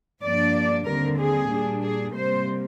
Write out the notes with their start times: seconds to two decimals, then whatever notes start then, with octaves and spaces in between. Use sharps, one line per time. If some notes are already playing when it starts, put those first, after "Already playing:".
0.22 G2 F3 A#3 D4 D5
0.86 D#2 D3 G3 C4 A#4
1.18 G#4
1.50 A#2 G3 D4
1.83 G#4
2.15 C3 G3 A#3 C5